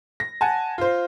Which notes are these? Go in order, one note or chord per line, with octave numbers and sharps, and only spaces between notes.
A#6
F#5 G#5 A5
F4 C5